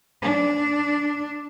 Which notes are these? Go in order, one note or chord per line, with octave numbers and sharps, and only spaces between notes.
D4